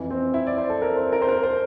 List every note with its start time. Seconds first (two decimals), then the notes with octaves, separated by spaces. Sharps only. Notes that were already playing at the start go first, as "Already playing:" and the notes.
Already playing: F2 E3
0.11 C4
0.34 E4
0.47 D5
0.58 C5
0.70 A4
0.82 A#4
0.97 C5
1.13 A#4
1.22 C5
1.28 A#4
1.43 C5